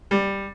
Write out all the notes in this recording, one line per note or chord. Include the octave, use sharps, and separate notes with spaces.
G3